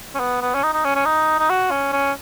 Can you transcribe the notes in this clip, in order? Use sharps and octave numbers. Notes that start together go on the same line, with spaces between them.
C#4
B3
B3
C#4
D#4
D#4
C#4
C#4
D#4
D#4
F#4
C#4
C#4